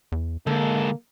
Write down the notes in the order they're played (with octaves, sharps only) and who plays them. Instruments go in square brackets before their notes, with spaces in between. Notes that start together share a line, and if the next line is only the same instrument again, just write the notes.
[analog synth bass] E2
[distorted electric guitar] G#2 A4 [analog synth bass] D3 [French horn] A#3